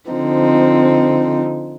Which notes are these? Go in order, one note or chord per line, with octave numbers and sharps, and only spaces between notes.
D3 F3 C4 D#4